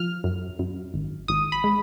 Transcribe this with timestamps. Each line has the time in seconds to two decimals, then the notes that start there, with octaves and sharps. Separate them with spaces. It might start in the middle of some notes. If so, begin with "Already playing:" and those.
Already playing: F3 F6
0.24 F#2
0.59 F#2
0.94 G#1
1.28 G#1 D#6
1.52 B5
1.64 G#3